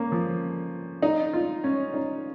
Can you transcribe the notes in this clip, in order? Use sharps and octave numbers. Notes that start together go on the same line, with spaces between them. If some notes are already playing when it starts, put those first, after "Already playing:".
Already playing: A#3 C#4
F3
D#4
F4
C#4
D#4